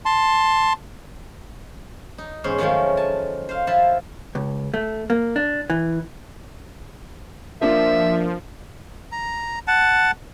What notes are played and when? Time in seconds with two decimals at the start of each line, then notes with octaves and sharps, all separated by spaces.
0.06 A5 C6
2.18 D#4
2.44 E2 G#2 C#4 C5
2.58 D#3 F3 F#3 G#3 A3 C#4
2.97 G#5 A5
3.49 C5 F5
3.67 F3 E4 E5 F5 A5
4.35 C#2
4.74 A3
5.10 A#3
5.36 D4
5.70 E3
7.61 F3 A#3 D4 E5
9.12 A#5
9.68 F#5 A5